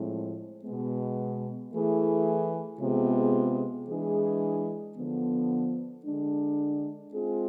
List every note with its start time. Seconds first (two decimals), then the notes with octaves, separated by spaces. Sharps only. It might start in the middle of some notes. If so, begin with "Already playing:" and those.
Already playing: A2 F3 G#3 C4 E4
0.64 B2 G#3 B3
1.72 E3 A3 E4 G#4
2.80 C3 G#3 B3 F4 G#4
3.88 E3 G#3 D4 G#4
4.96 D3 F3 B3
6.04 D3 G#3 D4
7.13 G#3 C4 F4 G#4